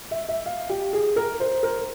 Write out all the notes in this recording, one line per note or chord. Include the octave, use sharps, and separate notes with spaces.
E5
E5
F5
G4
G#4
A#4
C5
A#4